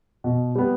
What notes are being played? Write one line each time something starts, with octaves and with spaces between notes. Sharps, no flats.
B2
G3 B3